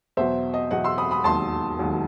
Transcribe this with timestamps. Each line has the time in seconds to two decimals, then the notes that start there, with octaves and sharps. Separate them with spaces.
0.17 E2 B2 F#3 C5 E5
0.54 D#5
0.71 E2 B2 F#3 D#5 F#5
0.84 C6 E6
0.98 B5 D#6
1.11 B5 D#6
1.24 E1 D#2 D#3 F#3 A5 C6
1.79 E1 D#2 D#3 F#3